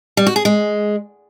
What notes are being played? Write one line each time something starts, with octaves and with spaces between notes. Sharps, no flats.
G3
F#4
G#4
G#3